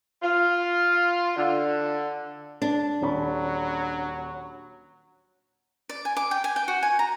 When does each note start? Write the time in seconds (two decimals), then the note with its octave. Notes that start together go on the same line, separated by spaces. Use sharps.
0.22 F4
1.36 D3
2.62 D4
3.01 D#1 F#3 C#4 B5
5.89 D5
6.05 G#5
6.17 D6
6.31 G5
6.44 G#5
6.56 G5
6.68 F#4
6.83 G#5
6.99 A#5